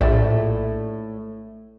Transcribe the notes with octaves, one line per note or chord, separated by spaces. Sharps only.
A#1 A2 D5 E5